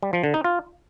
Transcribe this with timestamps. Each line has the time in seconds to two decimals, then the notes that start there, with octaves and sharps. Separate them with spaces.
0.03 G3
0.13 F3
0.24 D3
0.34 D#4
0.44 F4